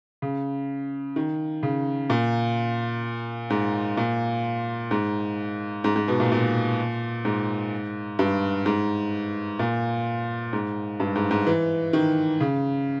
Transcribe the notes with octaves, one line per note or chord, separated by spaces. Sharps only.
C#3
D#3
C#3
A#2
G#2
A#2
G#2
G#2
G#2
B2
A#2
A#2
G#2
G2
G#2
A#2
G#2
G2
G#2
G#2
E3
D#3
C#3